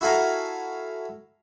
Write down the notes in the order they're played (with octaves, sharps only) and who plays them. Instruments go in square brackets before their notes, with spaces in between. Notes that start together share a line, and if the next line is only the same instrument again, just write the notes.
[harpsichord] E4 F#4 A4 F5 G#5 A#5